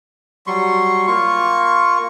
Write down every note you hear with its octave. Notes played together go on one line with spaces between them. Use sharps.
F#3 G3 C6 C#6
A#3 F4 C#6